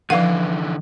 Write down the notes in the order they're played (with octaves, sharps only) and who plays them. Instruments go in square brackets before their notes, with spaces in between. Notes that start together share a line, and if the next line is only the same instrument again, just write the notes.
[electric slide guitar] D3 E3 [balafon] F3 F#5 [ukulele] E4 B4 F5